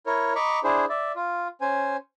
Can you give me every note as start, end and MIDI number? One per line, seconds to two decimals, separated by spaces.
0.07 0.33 64
0.07 0.33 70
0.07 0.33 73
0.36 0.59 75
0.36 0.59 82
0.36 0.59 83
0.36 0.59 85
0.36 0.59 86
0.64 0.85 62
0.64 0.85 64
0.64 0.85 68
0.64 0.85 72
0.89 1.12 74
0.89 1.12 76
1.16 1.48 65
1.61 1.97 61
1.61 1.97 72
1.61 1.97 80